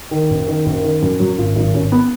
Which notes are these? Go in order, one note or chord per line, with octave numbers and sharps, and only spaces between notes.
D#3
F#1
D#3
F#1
D#3
F#2
F#2 F#3
G#1 F4
G#1 D#4
G#1 C#4
B3